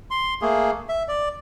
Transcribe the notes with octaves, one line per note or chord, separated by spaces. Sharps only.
C6
A3 A#3 G#4
E5
D5